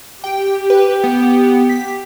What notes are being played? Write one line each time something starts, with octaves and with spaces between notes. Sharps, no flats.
G4 G5
B4
B3
B6